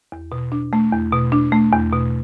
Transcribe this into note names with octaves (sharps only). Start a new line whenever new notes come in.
E2
B2
D4
A3
E2
B2
D4
A3
E2
B2